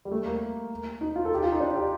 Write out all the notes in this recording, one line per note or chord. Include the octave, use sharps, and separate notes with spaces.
G3
A3
A#3
D#4
F4
A4
G4
F4
D#4
D4
G4